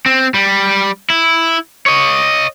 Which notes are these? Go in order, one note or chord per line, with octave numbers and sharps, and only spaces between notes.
C4
G3
E4
C#5 D#5